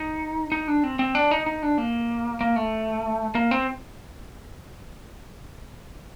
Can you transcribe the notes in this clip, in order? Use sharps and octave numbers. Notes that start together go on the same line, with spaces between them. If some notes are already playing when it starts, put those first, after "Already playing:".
Already playing: D#4
D#4
D4
C4
C4
D4
D#4
D#4
D4
A#3
A#3
A3
A#3
C4